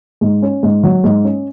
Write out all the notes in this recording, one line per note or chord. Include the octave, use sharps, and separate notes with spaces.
G#2
C#4
G#2
F#3
G#2
C#4